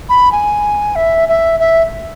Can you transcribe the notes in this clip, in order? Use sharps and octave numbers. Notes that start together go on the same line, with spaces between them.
B5
G#5
E5
E5
E5